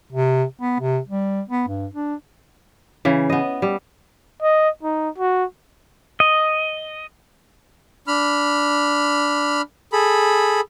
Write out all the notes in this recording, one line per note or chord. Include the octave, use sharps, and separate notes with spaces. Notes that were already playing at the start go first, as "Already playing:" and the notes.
C3
B3
C3
G3
B3
G2
D4
C#3 E3
B3 D#5
G3
D#5
D#4
F#4
D#5
D4 B5 F6
G#4 A4 B5